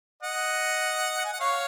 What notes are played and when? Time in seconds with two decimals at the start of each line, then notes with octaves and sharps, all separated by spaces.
0.23 D#5 F#5
1.25 G#5
1.33 F#5
1.40 C#5 F5